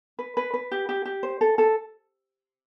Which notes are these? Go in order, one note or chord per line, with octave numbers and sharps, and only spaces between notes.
B4
B4
B4
G4
G4
G4
C5
A4
A4